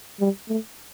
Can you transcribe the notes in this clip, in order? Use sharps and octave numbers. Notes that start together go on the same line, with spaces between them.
G3
A3